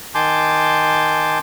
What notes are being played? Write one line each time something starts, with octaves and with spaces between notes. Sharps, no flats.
D#3 G#5 A5 C6 D6 G6